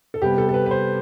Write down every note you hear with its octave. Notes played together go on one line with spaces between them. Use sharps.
A4
C3 G3 B3 G4
A4
A4
B4
B4
C5